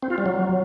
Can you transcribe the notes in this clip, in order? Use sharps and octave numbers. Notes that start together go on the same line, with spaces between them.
C4
F4
G3
F#3